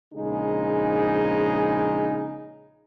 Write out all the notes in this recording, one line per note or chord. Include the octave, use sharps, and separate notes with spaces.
A#1 C#3 G#3 D#4 G#4